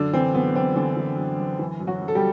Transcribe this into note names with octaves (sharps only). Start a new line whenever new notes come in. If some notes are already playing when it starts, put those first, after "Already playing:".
Already playing: F#2 D3 D4
E3 C4
F#2 B3
F#2 C4
D3 E3 D4
E3
F#2
F#2
E3
F#2
F#3 F#4
F#2
A4
G3 G4